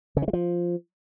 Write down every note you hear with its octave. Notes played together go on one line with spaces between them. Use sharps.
C#3
D#3
G#3
F3